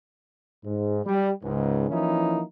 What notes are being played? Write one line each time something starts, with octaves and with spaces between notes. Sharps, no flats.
G#2
G3
C#2 G#2
E3 F3 A#3 C#4 D#4 E4